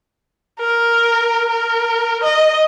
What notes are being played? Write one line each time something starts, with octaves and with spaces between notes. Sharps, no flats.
A#4
A#4
D#5